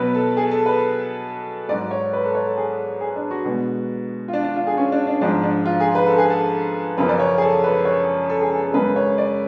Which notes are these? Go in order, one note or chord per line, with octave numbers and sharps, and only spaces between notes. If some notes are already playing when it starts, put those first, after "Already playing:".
Already playing: B2 F#3 B4
A4
G#4
A4
B4
G#2 F#3 D5
C#5
B4
A4
C#5
A4
G#4
G#4
D4
F#4
B2 G#3
F4
D4
D4
F4
G#4
C#4
D4
D4
G#2 F3 G#3 D4
D4
F4
G#4
B4
A4
G#4
A4
F#2 C#3 F3 B4
D5
C#5
G#4
A4
B4
C#5
A4
G#4
G#4
A4
F#2 C#3 G#3 B4
C#5
D5